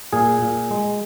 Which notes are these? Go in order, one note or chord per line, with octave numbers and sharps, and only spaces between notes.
A#2 G#4
A#2
G#3